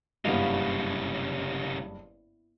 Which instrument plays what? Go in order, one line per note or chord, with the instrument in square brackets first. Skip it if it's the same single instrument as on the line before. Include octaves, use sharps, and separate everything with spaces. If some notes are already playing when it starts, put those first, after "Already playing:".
[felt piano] F#1 G2 [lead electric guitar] C2 C#3 [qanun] B3 E4 F5